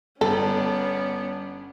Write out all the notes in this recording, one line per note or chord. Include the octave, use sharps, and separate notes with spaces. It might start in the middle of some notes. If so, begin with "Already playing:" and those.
G1 B3 C#4 D4 A4